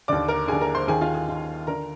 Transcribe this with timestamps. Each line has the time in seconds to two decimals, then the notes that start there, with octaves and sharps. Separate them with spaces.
0.08 D#2 D3 D5 D6
0.28 A#4 A#5
0.48 D#2 D3 G#4 G#5
0.61 A#4 A#5
0.75 C5 C6
0.88 D#2 D#3 G#4 G#5
1.01 F4 F5
1.14 G#4 G#5
1.28 D#2 D#3
1.67 D3 A#4 A#5